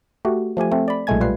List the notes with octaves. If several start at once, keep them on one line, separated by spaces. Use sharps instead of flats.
A3 F#4 G4
F3 A3 G4 G#5
A3 C4
D5 B5
B1 A#2 G#3 A3 G#5 G#6
G3 F4 B4 C7